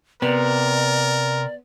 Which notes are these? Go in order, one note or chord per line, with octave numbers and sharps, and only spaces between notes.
C3 B3 A#4 D5